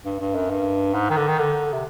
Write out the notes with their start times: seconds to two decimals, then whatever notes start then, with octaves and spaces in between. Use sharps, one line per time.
0.05 G2
0.20 G2
0.35 F#2
0.50 G2
0.94 G#2
1.10 D#3
1.17 D3
1.28 D#3
1.39 D3
1.73 C3